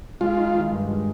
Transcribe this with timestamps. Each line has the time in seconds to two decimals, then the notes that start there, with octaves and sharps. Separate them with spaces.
0.21 G#3 F4
0.38 D#4
0.54 D#3
0.71 G2
0.87 G#3